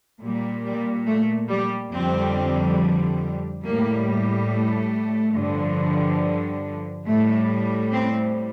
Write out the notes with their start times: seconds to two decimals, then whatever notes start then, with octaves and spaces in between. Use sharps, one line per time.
0.21 A#2 G3
0.64 G3
1.07 A3
1.50 G3
1.92 F2 D3 G3 C4
3.63 A2 G3 A#3
4.49 A3
5.35 G2 D3 F3
7.06 A2 G3 A3
7.92 C4